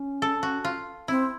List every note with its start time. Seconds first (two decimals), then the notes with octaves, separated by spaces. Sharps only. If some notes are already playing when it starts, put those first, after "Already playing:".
Already playing: C#4
0.22 A4
0.43 F#4
0.65 F4
1.08 C4 E4